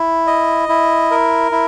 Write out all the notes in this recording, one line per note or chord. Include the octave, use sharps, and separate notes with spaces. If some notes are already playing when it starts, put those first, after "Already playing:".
Already playing: E4
D#5
E4
A#4
E4